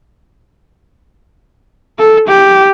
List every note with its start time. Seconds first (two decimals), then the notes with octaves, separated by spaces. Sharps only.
1.99 A4
2.28 G4